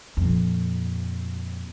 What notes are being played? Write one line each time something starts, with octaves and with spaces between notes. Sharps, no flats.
F2 A#2